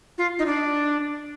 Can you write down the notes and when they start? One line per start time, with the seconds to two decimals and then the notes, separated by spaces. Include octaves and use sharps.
0.18 F4
0.39 D#4
0.46 D4